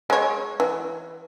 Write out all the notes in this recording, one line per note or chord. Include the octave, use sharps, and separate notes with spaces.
G#3 C#5
E3